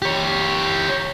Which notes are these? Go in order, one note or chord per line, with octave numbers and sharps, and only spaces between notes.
G4 C#5